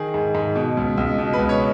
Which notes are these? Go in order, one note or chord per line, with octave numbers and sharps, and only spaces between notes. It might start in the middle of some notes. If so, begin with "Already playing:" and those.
Already playing: D#3 G#4
G#2
G#2
B2
C#2
C#2
B2
B4
C#2
C#5